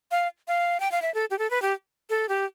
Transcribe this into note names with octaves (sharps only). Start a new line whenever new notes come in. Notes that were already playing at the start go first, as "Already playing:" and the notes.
F5
F5
G5
F5
E5
A4
G4
A4
B4
G4
A4
G4